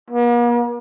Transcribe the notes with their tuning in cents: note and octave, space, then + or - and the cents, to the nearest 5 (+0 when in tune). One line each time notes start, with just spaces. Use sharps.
A#3 +45